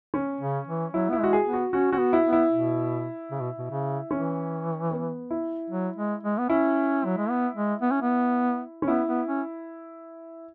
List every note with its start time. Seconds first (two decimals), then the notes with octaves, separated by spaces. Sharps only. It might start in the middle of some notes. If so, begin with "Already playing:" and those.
0.14 C#4
0.41 C#3
0.67 E3
0.93 F#3 E4
1.10 B3 E4
1.19 G#3 F#4
1.33 G#4
1.46 B3
1.53 F#4
1.73 C#4 F#4
1.92 C#4 F#4
1.99 B3
2.13 E4
2.26 B3
2.33 E4
2.52 B2
3.31 C#3
3.41 B2
3.58 B2
3.71 C#3
4.11 E3 C#4
4.91 B3
5.31 E4
5.70 F#3
5.96 G#3
6.23 G#3
6.38 B3
6.49 C#4 E4
7.05 F#3
7.17 G#3
7.30 B3
7.56 G#3
7.82 B3
7.91 C#4
8.02 B3
8.82 C#4
8.88 B3 E4
9.08 B3
9.28 C#4